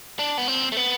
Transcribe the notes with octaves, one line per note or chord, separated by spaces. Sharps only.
D4
B3
C4
A3
B3